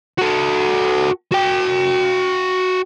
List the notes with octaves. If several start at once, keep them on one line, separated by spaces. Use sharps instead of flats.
F#4 A4
F#4 G5